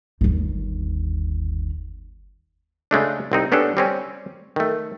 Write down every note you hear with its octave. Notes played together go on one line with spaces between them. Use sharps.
G1 D#2
C#3 G#3 A3 D4
C2 C4 D#4
B3 C#4 D4 G4 A4
G3 C4 C#4
D#3 A3